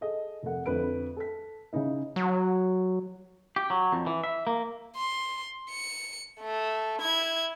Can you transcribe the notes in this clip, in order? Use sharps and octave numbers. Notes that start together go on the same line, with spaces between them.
G#4 A4 D#5
F1 A3 A4 A#4 F#5
F2 D3 A3 B4 B5 D7
A4 B6
C#3 C#4 D#4 E4
F#3
G4
F#3
F2
E3
E5
A#3
C6
C#7
A3
E4 G#6